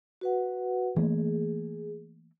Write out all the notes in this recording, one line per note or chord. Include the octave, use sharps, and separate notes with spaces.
F#4 B4 F#5
E3 A3 A#3 G#4